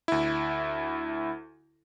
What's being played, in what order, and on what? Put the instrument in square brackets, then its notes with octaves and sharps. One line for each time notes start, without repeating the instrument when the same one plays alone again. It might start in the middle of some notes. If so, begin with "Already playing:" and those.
[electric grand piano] D2 E4